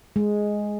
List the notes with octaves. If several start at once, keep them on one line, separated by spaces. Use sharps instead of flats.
G#3